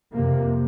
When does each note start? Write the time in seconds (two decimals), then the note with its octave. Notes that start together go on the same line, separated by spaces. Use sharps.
0.11 F2 C3 A#3